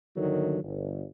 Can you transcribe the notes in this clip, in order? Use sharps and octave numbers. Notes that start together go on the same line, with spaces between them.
G1 D#2 D3 D#3 F#3
G1